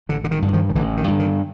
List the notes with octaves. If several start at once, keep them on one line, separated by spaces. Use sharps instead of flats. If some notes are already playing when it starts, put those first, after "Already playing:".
A1 D3
D3
D#3
G2 D3
D#3 F3
D#3
A1 D3 E3
D#3
G2 D3
D#3